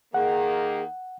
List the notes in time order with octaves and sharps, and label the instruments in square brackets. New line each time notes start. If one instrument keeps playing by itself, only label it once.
[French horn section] D#3 A#3 [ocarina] G#4 [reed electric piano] F#5